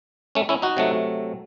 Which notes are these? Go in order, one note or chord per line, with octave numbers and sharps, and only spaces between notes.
A3 C#4
C#4 E4
D#4 F#4
C3 F#3 A3